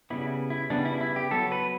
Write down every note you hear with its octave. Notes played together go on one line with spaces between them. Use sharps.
C#3 G3 B3 E4
E4
C#3 G3 B3 D4
E4
E4
G4
F#3 B3 A4
B4